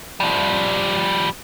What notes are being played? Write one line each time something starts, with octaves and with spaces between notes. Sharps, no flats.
F3 G3